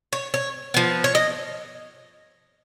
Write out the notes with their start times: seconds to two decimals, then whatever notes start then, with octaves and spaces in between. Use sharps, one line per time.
0.13 C#5
0.34 C#5
0.74 F3 B3
1.04 C#5
1.15 D#5